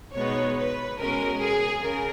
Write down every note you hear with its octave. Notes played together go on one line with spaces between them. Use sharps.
B2 G#3 B3 D#4 C#5
B4
B2 G#3 C#4 A#4
G#4
C#3 A#4